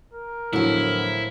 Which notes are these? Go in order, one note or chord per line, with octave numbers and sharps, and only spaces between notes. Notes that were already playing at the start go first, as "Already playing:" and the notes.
A#4
E2 A2 D3 F3 F#3 E4